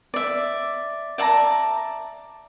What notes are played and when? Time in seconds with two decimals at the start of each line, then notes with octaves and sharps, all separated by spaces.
0.14 D5 E5
1.18 D5 E5 A5 A#5